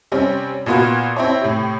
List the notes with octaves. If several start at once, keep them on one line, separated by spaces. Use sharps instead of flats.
C3 G3 C4 C#4
A#2 A#3 B3 F4 F#4
C4 E4 C#5
A2 C3